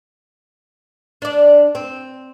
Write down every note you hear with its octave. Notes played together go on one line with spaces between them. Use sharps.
D4 D5
C4